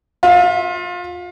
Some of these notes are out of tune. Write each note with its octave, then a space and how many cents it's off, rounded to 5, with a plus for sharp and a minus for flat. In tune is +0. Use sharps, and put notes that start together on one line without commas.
F4 +30 E5 -5